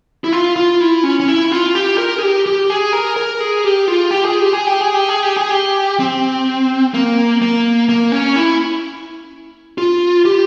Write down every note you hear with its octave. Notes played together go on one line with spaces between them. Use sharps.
E4
F4
F4
E4
C#4
C#4
E4
F4
G4
A#4
G#4
G4
G4
G#4
A#4
A#4
G#4
G4
F4
G4
G#4
G4
G#4
G4
G#4
G4
G#4
G4
G#4
G4
C4
A#3
A#3
A#3
C#4
E4
F4
G4